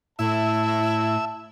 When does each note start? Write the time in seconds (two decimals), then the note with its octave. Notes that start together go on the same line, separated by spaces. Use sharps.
0.19 A2 E4 E5 A5